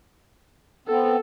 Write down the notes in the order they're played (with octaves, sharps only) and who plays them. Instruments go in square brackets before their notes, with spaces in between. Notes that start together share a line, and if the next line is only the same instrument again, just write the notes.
[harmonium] B3 C4 [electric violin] A4